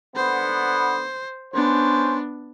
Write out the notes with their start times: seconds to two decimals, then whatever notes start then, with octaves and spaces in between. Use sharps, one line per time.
0.16 D3 B3 C5
1.54 B3 C#4 D4 C5